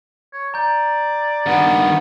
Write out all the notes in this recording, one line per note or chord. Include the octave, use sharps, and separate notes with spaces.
C#5
D5 A#5 G6
G2 D#3 B3